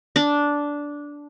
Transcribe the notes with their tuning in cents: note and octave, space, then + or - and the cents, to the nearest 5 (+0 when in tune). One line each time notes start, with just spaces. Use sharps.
D4 -10